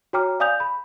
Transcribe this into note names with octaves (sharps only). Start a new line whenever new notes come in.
F#4 C#5 G5 A#5 D6 F6
D5 F5 G#5 D#6 G6 F7
B5